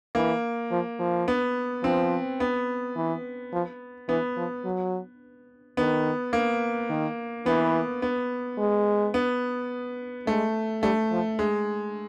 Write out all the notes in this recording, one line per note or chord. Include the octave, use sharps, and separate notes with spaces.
E3 A#3
F3
F3
B3
F3 C4
B3
E3
F3
E3 B3
F3
F#3
D#3 B3
A#3
D#3
E3 B3
B3
G#3
B3
G#3 A3
G3 A3
F3
G#3